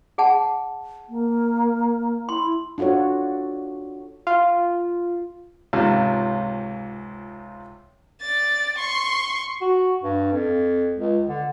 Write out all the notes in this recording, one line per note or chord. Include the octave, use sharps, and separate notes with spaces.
G#4 F#5 A5
A#3
E4 C6
D4 F4 F#4 A4 C#5
F4
C#2 G#2 C3 C#4 F4 A5
D5 A6
C6 C#6
F#4
G2
F2
C#2
D3